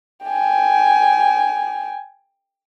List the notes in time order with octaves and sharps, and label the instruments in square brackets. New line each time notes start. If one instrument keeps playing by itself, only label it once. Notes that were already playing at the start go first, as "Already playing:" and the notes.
[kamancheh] G5 G#5